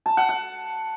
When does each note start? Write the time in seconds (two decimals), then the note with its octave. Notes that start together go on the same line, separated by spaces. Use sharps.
0.06 A5
0.17 F#5
0.29 F#5